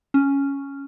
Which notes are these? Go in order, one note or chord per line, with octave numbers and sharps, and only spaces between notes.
C#4